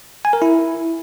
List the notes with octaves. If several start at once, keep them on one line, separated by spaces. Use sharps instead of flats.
G#5
A#4
E4